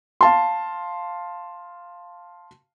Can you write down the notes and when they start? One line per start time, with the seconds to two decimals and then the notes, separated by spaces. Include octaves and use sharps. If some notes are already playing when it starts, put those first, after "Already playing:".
0.21 F5 A5 C6